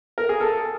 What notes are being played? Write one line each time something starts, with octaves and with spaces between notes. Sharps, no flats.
A#4
G#4
A4